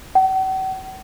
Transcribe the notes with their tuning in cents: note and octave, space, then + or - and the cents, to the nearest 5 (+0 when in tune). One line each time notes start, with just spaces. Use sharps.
F#5 +45